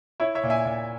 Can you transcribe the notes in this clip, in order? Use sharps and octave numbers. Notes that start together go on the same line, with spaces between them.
E4 C#5 E5
C#5 E5
A#2
E5 G#5
A#2